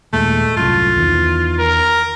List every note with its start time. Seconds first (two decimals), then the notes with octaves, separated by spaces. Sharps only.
0.13 D#2 A#2 G#3 A3
0.57 C2 F#2 A2 F4
0.96 E2 D#3 E3
1.59 A#4